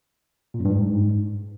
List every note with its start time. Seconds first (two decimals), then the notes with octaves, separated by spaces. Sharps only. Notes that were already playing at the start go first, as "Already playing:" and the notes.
0.54 A#2
0.60 F#2
0.65 G2
0.70 G#2